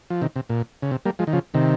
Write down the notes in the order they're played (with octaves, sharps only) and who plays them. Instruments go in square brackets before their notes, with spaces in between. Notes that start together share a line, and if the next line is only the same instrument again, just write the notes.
[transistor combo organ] F3
C3 D#3
C3
A#2
C#3
C3
G3 A#3
F3 G#3
D#3
C#3 F3
C3 D#3